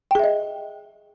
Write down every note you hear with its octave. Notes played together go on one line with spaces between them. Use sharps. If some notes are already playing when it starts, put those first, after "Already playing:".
G#4 D#5 E5 G5